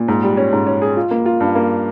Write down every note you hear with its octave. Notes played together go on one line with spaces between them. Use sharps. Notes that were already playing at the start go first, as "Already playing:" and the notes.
Already playing: A#2
G#2
G3
C#4
G#2
C#4
G#4
F4
A#3
F4
G2
A#3